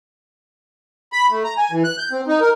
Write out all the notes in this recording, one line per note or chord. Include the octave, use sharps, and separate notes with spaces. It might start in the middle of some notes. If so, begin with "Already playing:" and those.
B5
A3
A#5
G#5
E3
F#6
G6
C4
D#4
A#4